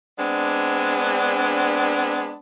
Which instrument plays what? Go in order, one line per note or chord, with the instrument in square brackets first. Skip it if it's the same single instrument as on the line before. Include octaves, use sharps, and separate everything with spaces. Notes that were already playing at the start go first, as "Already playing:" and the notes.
[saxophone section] G#3 B3 C4 D4